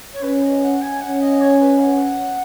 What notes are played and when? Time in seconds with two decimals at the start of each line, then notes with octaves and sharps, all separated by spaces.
0.12 C#5
0.22 C#4 B4
0.42 D#5
0.62 F#5
0.81 G#5
1.00 C#4 F#5
1.20 D#5
1.40 C#5
1.59 B4
1.78 F#5